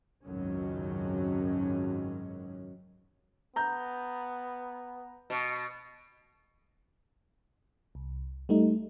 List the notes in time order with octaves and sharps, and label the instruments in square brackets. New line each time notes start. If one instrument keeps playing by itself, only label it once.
[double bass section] G#1 C#2 F#2 D#3 F#3 C#4
[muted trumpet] B3 [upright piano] A#5 G6
[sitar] B2
[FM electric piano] C2
G3 A3 D#4